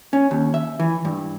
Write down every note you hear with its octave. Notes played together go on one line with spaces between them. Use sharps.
C#4
D#2
E5
E3
G2